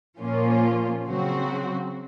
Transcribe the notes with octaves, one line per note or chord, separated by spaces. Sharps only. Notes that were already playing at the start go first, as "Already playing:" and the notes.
A#2 F3 A#3 C#4 F4
C#3 F#3 C4 F#4